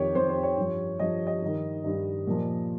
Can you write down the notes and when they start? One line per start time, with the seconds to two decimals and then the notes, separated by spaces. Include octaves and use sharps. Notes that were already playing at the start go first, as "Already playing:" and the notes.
Already playing: F2 D#3 G4 C#5
0.15 F2 D#3 C5
0.29 C5
0.43 C#5
0.57 G2 F3
0.99 G2 F3 D#5
1.27 D#5
1.42 G2 D#3
1.84 G2 D#3
2.27 A#2 F3